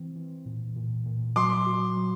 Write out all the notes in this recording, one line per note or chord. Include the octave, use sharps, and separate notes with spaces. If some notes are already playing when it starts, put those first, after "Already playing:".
Already playing: E3 C4
E3
A#2
A#2
A#2
F#3 C6 D6
F#4
F#3